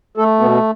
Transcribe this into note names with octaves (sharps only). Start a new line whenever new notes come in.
A3 A4
B2 B3